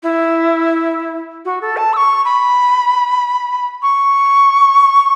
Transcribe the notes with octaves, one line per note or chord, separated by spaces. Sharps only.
E4
F#4
A4
A5
E6
C#6
B5
C#6